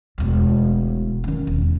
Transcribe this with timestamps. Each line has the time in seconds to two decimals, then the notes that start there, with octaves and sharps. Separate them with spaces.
0.18 E1 D2
1.24 D#3 C#4
1.47 E1